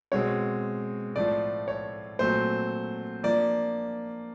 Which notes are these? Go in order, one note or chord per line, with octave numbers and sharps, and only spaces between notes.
B2 G#3 C4 C#5
A2 F3 A3 D5
C#5
A#2 F#3 A3 C4 C5
F3 A#3 D4 D5